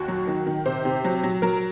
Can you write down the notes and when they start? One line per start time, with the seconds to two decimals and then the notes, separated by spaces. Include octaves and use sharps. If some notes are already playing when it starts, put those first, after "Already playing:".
Already playing: D#2 F#4
0.08 F#3
0.27 D#3
0.46 D#3
0.66 C3 C5
0.85 C3
1.04 F#3
1.23 F#3
1.42 F#3 A#4